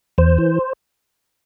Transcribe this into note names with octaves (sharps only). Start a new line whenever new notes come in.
E2 C5
E3